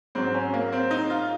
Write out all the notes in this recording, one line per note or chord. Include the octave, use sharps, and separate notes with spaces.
G#2 F#3 C4
C#4
A#3
C4
D#4
F4